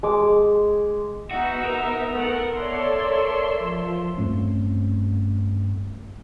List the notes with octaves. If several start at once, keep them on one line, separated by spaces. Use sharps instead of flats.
G#3 D6
B3 D#4 F#4 E5
A#4
A3 F#5
A4 C#5 D5 E5 C6
F3
G2 A3 C4 C#4